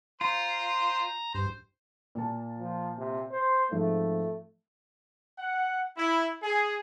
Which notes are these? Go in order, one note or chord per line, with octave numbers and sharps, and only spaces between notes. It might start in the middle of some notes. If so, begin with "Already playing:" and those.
F4 C5 A#5 C6
G2 C5
A#2 A#3 A5
F3
C3
C5
G#2 F3 A3 C4
F#5
E4
G#4